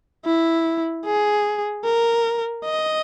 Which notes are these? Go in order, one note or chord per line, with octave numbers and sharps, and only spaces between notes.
E4
G#4
A#4
D#5